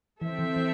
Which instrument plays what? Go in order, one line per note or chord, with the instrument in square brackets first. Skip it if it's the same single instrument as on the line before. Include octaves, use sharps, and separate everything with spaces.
[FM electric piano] E3 [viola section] C4 A4 E5
[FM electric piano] E3
E3